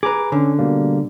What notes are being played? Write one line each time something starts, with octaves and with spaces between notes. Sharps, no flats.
G#4 B4 A#5 D6
D3 C#4
B2 G3 A#3